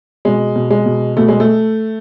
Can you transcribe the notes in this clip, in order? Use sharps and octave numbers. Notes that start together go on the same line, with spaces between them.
B2 G#3
B2
G#3
B2
B2 A3
G#3
A3